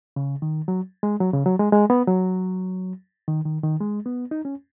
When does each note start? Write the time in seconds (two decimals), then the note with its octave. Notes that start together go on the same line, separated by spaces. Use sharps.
0.16 C#3
0.42 D#3
0.68 F#3
1.03 G#3
1.20 F#3
1.34 C#3
1.46 F#3
1.59 G#3
1.73 G#3
1.90 B3
2.07 F#3
3.28 D#3
3.45 D#3
3.63 D#3
3.81 G#3
4.06 B3
4.31 D#4
4.45 C#4